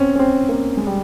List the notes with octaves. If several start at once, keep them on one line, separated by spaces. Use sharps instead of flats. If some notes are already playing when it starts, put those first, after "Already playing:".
Already playing: C4 C#4
C#4
C4
A#3
G#3
G3